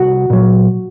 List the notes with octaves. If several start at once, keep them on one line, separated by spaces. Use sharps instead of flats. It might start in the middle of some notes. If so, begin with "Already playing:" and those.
Already playing: C2 F#4
A#2 F#3